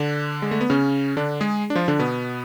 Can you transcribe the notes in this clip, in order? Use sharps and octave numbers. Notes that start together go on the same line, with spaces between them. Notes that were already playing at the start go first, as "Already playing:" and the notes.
Already playing: D3 D4
G#3
A3
B3
C#3 C#4
D3 D4
G#3 G#4
D4
F3 F4
D3 D4
B2 B3